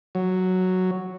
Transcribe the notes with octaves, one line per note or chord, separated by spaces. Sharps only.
F#3